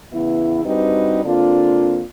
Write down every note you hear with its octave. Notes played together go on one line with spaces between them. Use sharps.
E2 C#3 B3 E4
G2 G3 C4 D#4 F#4 B4
D3 A#3 C4 D4 F4